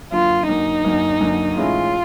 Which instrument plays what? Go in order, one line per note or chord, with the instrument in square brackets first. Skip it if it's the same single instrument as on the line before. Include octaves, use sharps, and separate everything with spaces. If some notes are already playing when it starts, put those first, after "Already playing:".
[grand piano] F#2 D3 F#3 A#3 [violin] F4
[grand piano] F#2 D3 F#3 A#3 [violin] D#4
[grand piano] F#2 D3 F#3 A#3
F#2 D3 F#3 A#3
[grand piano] A2 E3 G#3 C#4 E4 [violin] F4